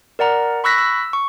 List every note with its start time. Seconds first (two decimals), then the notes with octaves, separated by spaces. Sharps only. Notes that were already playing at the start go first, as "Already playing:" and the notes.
0.19 A#4 D5 F#5 A#5
0.64 B5 C#6 E6 F#6 A#6 B6
0.78 E6
1.13 C#6